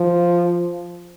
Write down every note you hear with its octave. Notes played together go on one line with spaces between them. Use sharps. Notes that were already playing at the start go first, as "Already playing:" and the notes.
Already playing: F3